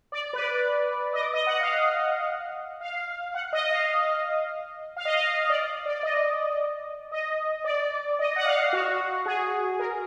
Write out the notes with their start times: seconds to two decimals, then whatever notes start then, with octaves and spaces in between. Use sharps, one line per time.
0.12 D5
0.33 B4
0.39 D5
1.13 D#5
1.19 D5
1.33 D#5
1.47 F#5
1.60 F5
2.81 F5
3.34 F#5
3.53 D#5
3.71 F5
4.97 F5
5.05 D#5
5.15 F5
5.50 D5
5.86 D5
6.03 D#5
7.11 D#5
7.64 D5
8.19 D#5
8.36 F#5
8.46 F5
8.73 F#4
9.26 G#4
9.79 A#4